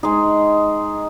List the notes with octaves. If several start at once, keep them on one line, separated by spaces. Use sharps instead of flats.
G#3 D#4 G#4